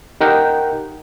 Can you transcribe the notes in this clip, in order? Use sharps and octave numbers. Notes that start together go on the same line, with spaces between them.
D#4 G4 A#4 F#5 G5